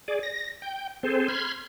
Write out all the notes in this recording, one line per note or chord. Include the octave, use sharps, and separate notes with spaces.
G#4 D5
A#6
G5
C4 G#4 A4 C5
B5 C6 F6 G#6